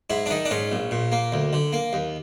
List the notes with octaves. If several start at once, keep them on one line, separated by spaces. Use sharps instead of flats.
G#2 E4
D4
D#3 D#4
D4
G#2 C#4
A#1
A#2
A#3
D2
D3
A#3
D#2